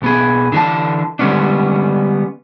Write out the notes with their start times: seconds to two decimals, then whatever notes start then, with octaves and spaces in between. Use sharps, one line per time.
0.02 B1 B3 G#4
0.52 D3 E3 F3 D4 A5
1.19 D3 G3 G#3 B3 C#4 D4